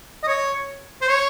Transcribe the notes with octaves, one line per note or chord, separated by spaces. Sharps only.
D#5
C#5
C5
C#5